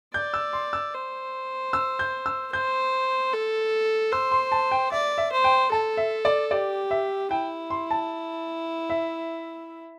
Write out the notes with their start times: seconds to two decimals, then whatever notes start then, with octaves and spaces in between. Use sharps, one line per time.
0.14 D5 G6
0.34 E6
0.53 C6
0.73 E6
0.94 C5
1.73 E6
1.99 G6
2.26 E6
2.52 C5 G6
3.33 A4
4.12 C5 E6
4.32 C6
4.52 A5
4.71 G5
4.92 D5 E5
5.18 E5
5.32 C5
5.44 G5
5.71 A4 A5
5.97 E5
6.25 D5
6.51 G4 D5
6.91 E5
7.31 E4 G5
7.70 C6
7.91 A5
8.90 E5